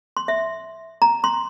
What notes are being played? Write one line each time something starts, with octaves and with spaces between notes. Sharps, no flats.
C6
E5
A#5
C6